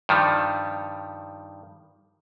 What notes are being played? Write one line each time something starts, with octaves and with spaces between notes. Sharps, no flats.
G2 D#3 F3 G3